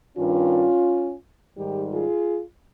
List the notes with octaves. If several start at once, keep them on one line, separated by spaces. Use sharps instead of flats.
G2 D#3 G3 C#4 F4
G#2 D#3 G3 D#4 G4
F4 G#4